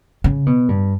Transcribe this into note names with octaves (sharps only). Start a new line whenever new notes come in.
C#3
B2
G2